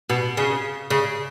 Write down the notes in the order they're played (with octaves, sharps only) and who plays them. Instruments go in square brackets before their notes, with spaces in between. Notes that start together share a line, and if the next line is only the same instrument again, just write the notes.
[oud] B2
C#3
C#3